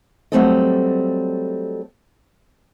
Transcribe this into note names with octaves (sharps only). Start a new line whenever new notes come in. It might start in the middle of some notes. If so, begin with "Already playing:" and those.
F#3 G3 A3 C4 A4 D#5